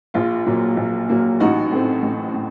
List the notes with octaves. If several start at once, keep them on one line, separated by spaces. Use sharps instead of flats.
A#1 F4
A#2 F#3 A#3
A#1
A#2 F#3 A#3
A1 D#4 F#4
A2 A3 C4
A1
A2